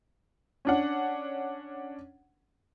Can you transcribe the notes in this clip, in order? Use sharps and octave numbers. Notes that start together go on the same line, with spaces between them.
C#4 D4 F#5